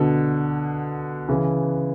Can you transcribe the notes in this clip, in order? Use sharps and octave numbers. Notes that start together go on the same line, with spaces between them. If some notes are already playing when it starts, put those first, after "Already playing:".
Already playing: B2 D3
C#3 E3